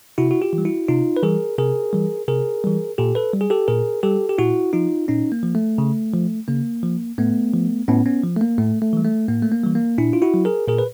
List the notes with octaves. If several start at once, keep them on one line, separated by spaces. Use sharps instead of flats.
C3 E4 F#4
F#4
F4 G4
E3
G3
E4 F#4
C3 D#4 F4
B4
E3 G3 G#4 A#4
C3 G#4 A#4
E3 G3
C3 G#4 A#4
E3 G3
A#2 G4 A4
A4 B4
G3
G#4
G4 A4
A#2 G#4 A#4
G3 G4 A4
G4
A#2 E4 F#4
F3 D#4 F4
A#2 C#4 D#4
A#3
F3
A3
C#3
F3
C#3 A#3
F3
A2 A3 B3
F3
A2 B3 C#4
B3 C#4
F3
A3
A#3
A2 A3
A3
E3 G3
A3
A2 A#3
A3
A#3
E3 G3
A#3
A#2 D4 E4
F4
E4 F#4
F#3
G#4 A#4
A#2 G#4 A#4
B4